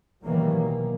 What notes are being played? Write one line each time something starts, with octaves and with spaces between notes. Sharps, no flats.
B2 D#3 E3 F#3 G3 A#3
A#3